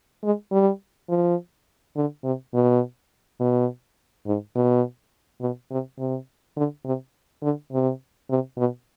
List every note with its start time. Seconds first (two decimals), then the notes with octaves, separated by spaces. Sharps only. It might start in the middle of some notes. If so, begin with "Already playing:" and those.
0.24 G#3
0.52 G3
1.09 F3
1.97 D3
2.24 C3
2.54 B2
3.40 B2
4.27 G#2
4.56 B2
5.41 B2
5.71 C3
5.99 C3
6.57 D3
6.85 C3
7.43 D3
7.72 C3
8.30 C3
8.58 B2